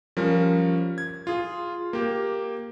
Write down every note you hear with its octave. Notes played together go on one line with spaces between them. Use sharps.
F3 G3 C#4 A#4
G#6
F4 G#4
A#3 G4